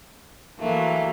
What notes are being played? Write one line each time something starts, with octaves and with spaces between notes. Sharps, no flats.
E3 F#3 A3 A#3